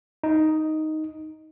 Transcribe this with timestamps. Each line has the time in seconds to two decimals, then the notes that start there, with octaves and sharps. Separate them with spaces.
0.23 D#4